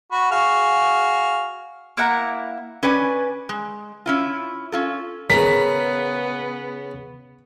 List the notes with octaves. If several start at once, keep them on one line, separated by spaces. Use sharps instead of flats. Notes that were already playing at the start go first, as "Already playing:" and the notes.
F#4 B5
F#4 G#4 F5
A#3 E4 F#5 A#5
C#4 B4 D5 G#5
G#3
C#4 E4 F4
C#4 F4 A4
C#3 B3 G#4 A#4 B6